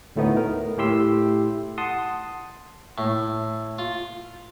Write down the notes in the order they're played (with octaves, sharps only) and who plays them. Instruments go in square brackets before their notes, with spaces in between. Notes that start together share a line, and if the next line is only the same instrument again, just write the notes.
[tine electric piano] D2 A2 A3 B3 D#4
A#4
A2 A3 E4 G4 C6 E6
F#5 A5 C6 D#6
[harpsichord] A2
F4